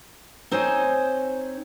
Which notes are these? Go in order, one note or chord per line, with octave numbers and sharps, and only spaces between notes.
C4 D#4 C5 C#5 G#5